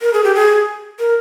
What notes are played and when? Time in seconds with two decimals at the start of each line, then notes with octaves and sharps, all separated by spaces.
0.01 A#4
0.13 G#4
0.24 G4
0.35 G#4
0.99 A#4